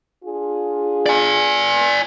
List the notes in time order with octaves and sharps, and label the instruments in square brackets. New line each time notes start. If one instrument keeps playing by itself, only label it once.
[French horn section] D4 F4 G#4
[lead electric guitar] D5 G#5